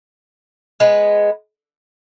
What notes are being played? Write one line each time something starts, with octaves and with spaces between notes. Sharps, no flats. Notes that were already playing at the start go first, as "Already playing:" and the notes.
G#3 B3